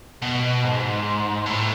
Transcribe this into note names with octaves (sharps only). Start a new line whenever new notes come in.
B2
G#2
A2